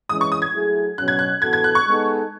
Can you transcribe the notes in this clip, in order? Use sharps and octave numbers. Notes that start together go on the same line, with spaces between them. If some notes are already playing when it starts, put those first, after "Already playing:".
E3 G#3 C#4 D#6
C#6
D#6
G#6
F#3 A3 E4 G#4
B2 F#3 C#4 F#6
G#6
F#6
E3 B3 F#4 A4 G#6
G#6
F#6
C#6
G#3 B3 D#4 A4